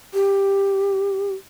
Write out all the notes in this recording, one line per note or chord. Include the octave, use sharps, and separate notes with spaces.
G4